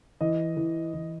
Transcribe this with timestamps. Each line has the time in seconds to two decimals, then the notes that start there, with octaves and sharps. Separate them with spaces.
0.21 E3 D#5
0.57 E3
0.94 E3